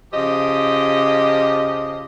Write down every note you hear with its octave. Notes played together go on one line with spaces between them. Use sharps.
C#3 F3 G4 D#5